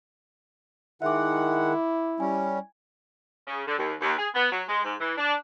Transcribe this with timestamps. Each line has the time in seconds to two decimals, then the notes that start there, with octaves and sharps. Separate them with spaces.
1.02 D#3 G#3 E4 E5 F#5 D6
2.20 G3 C#4 G#5
3.47 C#3
3.67 D3
3.79 D#2
4.01 D#2
4.18 G#4
4.35 B3
4.52 F#3
4.69 G#3
4.84 G#2
5.00 E3
5.17 D4